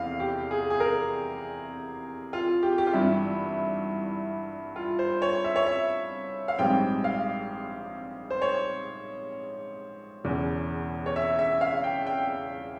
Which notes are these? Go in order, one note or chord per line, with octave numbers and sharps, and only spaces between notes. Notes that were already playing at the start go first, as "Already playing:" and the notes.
Already playing: F1 E2 C3 E3 F5
G4
G#4
G#4
A#4
F4
G4
G4
F4
G#1 G2 E3 E4
F4
C5
C#5
E5
C#5
E5
F5
A#1 G#2 G3 C4 G5
F5
C5
C#5
E1 E2 C#3
C#5
E5
E5
F5
G5
G5